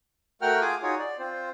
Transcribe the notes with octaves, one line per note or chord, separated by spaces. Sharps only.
A3 F#4 A#4 F#5 G5 F6
F4 G#4 D6 D#6
D#4 F4 F#4 G#4 C#5
D5
C4 F4 C5